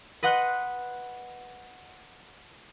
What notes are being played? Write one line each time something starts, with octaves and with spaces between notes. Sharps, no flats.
B4 D#5 F#5 C6 F#6